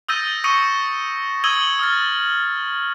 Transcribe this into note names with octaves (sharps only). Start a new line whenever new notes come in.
D#6 E6 G6 A6 A#6 D#7
C#6 D#6 A#6 C#7 D#7
D#6 E6 G#6 D#7 F#7 G7
D#6 F6 A6